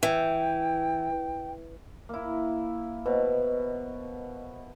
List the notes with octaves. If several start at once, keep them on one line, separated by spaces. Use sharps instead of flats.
E3 G5
A#3 E4
B2 B4 C5 D#5